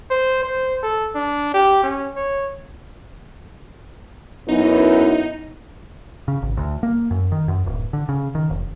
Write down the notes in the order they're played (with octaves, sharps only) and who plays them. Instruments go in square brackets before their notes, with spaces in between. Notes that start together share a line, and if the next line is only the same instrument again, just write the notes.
[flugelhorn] C5
C5
A4
D4
G4
C#4
C#5
[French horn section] F#2 B3 E4 [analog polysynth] D#4
[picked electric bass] C#3
G#1
D2
A#3
F#2
D#3
F#2
D1
D3
C#3
D#3
F1